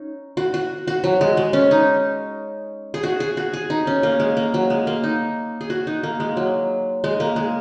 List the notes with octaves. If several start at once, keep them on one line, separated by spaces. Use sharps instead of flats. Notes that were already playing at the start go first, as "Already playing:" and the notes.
Already playing: C#4 D#4
F#4
F#4
F#4
F#3
G#3
G#3
C#4
D#4
G#4
F#4
G#4
F#4
G#4
D#4
C#4
A#3
G#3
A#3
F#3
G#3
A#3
D#4
G#4
F#4
D#4
A#3
G#3
F#3
G#3
A#3
G#3